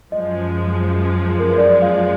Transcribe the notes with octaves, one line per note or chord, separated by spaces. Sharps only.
F#2 F3 G#3 D#5
A#4
B4
D5
F5